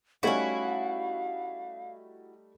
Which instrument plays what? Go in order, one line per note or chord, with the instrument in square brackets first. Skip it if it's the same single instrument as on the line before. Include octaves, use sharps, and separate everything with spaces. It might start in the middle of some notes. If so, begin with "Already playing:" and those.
[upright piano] G3 A3 D#4 [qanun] C#4 C#5 [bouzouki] E4 F#4 [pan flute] F5